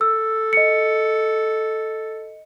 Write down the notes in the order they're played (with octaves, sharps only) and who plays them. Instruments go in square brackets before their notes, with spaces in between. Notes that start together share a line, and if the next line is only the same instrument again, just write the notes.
[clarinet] A4 [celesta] E6
[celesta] D#5 C#7